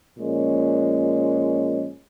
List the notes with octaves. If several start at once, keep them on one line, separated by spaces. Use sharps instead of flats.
A#2 F3 G#3 C#4